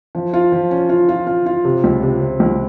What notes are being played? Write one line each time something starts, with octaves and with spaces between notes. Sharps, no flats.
F3
F4
F3
C#4
F4
F4
F4
F4
C3
C#2
C3
C3
C#2